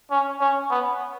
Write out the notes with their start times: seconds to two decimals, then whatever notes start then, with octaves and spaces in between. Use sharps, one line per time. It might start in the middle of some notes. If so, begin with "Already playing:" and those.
0.11 C#4
0.40 C#4
0.70 B3